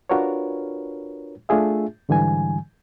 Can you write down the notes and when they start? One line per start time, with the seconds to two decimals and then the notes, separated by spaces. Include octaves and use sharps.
0.10 D4 F4 F#4 A#4 B4 C#5
1.49 A3 D4 F4 G#4 E5
2.09 G#2 D3 E3 G3 G#5